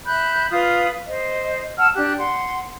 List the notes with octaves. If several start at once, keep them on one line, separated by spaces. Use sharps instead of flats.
E5 B5 F#6 G6
F4 B4 F5 D#6
C5 D#5
F#5 A5 E6 F6
D4 G4 F#6
F#5 C6